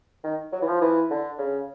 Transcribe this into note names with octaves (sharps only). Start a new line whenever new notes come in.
D#3
F#3
E3
F3
E3
D3
C#3